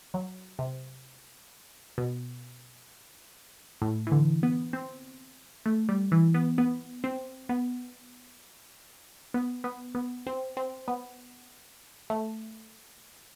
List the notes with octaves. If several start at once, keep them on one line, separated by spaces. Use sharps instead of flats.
F#3
C3
B2
A2
E3
D3
B3
C4
A3
G3
E3
B3
B3
C4
B3
B3
B3
B3
C4
C4
B3
A3